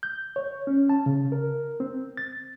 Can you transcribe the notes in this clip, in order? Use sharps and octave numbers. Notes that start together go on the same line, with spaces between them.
G6
C#5
C#4
A5
C#3
A#4
C4
A6